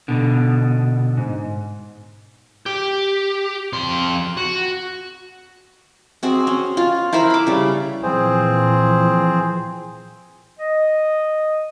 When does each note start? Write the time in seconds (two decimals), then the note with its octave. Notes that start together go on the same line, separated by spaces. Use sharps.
0.08 B2 D3
1.17 G#2
2.66 G4
3.73 F2 C6
4.37 F#4
6.23 C4 F#4 G#4
6.47 C#4
6.77 F4
7.13 E4 A#4 C5 B5
7.30 B5 D6
7.47 C#3 G3
8.03 A#2 E3 F3 C4 G#4 C5
10.59 D#5